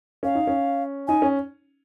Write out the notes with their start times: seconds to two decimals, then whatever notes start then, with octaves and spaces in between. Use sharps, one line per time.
0.23 C#4 F5
0.35 D#4
0.47 C#4
1.07 D#4 G#5
1.22 C#4